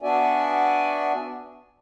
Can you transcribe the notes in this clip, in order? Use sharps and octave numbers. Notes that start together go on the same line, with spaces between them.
B3 D4 F#4 D5 E5 G#5